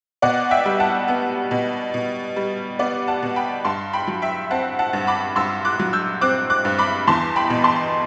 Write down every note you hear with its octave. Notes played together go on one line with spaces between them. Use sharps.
B2 D5 F#5
E5 G5
G3
F#5 A5
B3
B2
B2
G3
B3 D5 F#5
F#5 A5
B2
G5 B5
G2 A5 C6
G5 B5
F#3
E5 G5
C4 F#5 A5
F#5 A5
G2
B5 D6
G2 C6 E6
D6 F#6
F#3
E6 G6
C4 D6 F#6
D6 F#6
G2
B5 D6
E2 A5 C6
G5 B5
B2
A5 C6